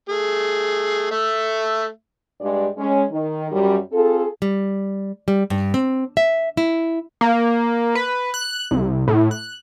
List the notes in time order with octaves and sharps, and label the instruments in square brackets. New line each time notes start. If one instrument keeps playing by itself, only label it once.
[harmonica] A3 G#4
A3 E5
[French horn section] G2 G#3 G4 D5
G#3 C#4
D#3
F#2 G3
C4 F4 G#4 A4
[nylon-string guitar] G3
G3
G2
C4
E5
E4
[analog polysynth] A#3
B4
F#6
C2
A2
F#6